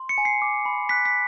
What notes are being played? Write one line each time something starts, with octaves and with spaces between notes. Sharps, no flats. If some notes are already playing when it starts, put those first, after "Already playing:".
Already playing: C6
C#7
G#5
C7
D6
B5
F#6 B6
B6